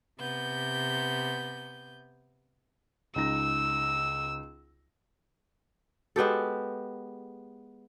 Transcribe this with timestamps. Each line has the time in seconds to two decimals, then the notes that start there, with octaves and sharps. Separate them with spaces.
0.19 C3 B3 G6
3.16 C#2 D#4 E6 A#6
6.16 G#3 B3 G4 A4